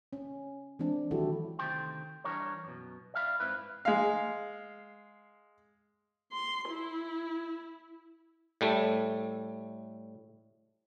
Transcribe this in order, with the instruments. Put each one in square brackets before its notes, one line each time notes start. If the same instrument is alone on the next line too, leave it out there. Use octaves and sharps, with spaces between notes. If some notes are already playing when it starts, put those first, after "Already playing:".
[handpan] C#4
E3 G#3 C4 D4
D#3 F#3 E4 F#4 G4 A4
[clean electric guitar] D2 C3 D#3 A3 G5 C6
E3 G3 D4 A#4 C#5
F#2 B2
D5 E5 F5 G5 B5
G#2 C4 E4 B4
[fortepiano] G#3 F5
[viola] C6
E4
[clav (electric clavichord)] A2 G3 A3